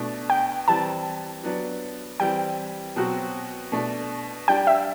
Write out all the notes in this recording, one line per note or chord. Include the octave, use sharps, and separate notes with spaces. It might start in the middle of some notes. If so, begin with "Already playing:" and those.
Already playing: B2 A3 D4
G5
E3 G3 C4 A5
F#3 B3 D4
E3 G3 C4 G5
B2 F#3 C4 F#4
B2 A3 D4
G3 D4 G4 G5
E5